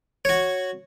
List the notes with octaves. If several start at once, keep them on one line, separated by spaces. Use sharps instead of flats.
F#4 C#5